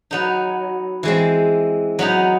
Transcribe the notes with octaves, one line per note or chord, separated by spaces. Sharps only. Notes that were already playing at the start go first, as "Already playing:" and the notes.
F#3 B3 D#4
E3 G#3 C4
F#3 B3 D#4